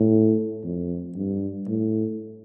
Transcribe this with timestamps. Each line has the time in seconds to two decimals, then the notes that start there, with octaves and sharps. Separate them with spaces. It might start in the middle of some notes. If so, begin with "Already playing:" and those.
Already playing: A2
0.64 F2
1.16 G2
1.67 A2